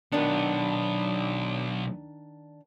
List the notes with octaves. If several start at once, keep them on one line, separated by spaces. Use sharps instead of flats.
B1 D#3 B3 D4